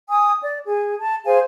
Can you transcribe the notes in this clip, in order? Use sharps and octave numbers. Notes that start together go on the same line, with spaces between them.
G#5 D#6
D5
G#4
A5
G#4 C5 F5 G#5